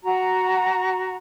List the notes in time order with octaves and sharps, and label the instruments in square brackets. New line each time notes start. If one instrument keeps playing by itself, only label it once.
[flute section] F#4 A#5